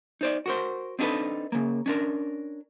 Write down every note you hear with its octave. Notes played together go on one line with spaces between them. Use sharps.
D#4 C5 D5
F#4 A#4 C5
C4 D4 D#4 F#4 A4 B4
C#3 A#3
C#4 D4 A#4